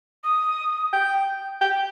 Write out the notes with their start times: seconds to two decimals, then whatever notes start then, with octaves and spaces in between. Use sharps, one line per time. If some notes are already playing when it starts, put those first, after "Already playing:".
0.24 D#6
0.93 G5
1.61 G5